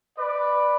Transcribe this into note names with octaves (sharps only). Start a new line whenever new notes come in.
B4 D5